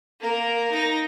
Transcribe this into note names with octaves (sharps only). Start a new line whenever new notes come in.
A#3 A#4
D#4 A#6